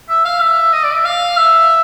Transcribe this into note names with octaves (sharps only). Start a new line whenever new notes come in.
E5
F5
E5
D#5
D5
E5
F5
E5